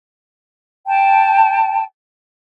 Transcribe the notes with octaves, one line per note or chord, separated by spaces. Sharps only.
G5 A5